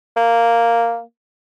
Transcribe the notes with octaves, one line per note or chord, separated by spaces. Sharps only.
A#3